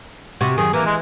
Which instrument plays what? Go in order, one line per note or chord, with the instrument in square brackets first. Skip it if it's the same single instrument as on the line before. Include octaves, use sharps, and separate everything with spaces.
[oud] C3 F#4
[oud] F#2 D#3 [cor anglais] G#4
[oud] E3 [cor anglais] A#3
[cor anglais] G#3